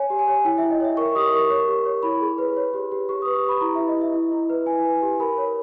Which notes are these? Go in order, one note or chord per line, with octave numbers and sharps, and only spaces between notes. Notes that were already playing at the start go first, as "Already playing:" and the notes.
Already playing: C#5 G#5
G4
G#5
C#5
E4 G5
E5
E4
D#5
C#5 E5
A#4 C#6
G4 D#6
A#4 C#6
C#5
G4
C#5
E4 B5
G#4
B4
C#5
G4
G4
G4 C#6
D#6
B4
C#6
G4 B5
E4 A#5
E4 E5
D#5
E4 E5
E4
E4
B4
E4 G#5
B4
G4
A#4 B5
C#5